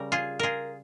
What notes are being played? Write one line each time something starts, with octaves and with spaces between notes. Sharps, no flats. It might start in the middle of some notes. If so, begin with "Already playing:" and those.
Already playing: C#3 G3 A#4
F4 G#4
F4 G#4 A#4